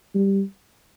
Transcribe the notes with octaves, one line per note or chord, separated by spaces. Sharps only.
G3